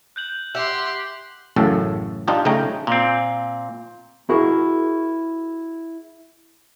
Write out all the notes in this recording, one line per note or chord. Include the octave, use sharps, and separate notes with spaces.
F#6 G6 F#7
G4 E5 F#5 C6 F#7
A1 F#2 A2 C#3 A4
D4 D#4 F4 G4
C#3 A3 C#4 D#4 G5 A#5
A#2 C4
E4 F#4 G#4 A#4